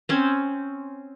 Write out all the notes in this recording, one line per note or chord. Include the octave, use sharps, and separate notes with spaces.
C4 C#4